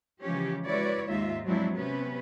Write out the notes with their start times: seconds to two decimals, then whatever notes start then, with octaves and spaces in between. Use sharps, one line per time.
0.23 C#3 E3 F3 G#3 C#4 G4
0.65 G#3 E4 F#4 B4 C#5 D5
1.07 D#2 G#2 D#4 F4 E5
1.45 F3 F#3 G#3 C4 D4 E4
1.74 C3 B3 C#4 B4